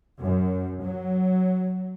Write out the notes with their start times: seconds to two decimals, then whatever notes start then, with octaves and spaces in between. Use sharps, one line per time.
0.22 F#2
0.84 F#3